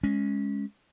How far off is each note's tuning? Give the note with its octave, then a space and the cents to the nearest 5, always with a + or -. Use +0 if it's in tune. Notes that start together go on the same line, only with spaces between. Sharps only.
G#3 +0 C#4 +0